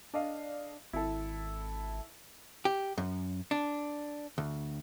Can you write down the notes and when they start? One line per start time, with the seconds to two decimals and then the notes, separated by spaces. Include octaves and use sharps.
0.14 D4 A4 D#5 F5
0.93 G#1 E4 A4
2.65 G4
2.98 F#2
3.51 D4
4.38 D2